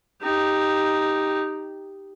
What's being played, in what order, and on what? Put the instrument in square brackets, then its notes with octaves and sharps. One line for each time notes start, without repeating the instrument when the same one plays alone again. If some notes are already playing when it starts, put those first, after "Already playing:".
[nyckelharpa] D#4 G4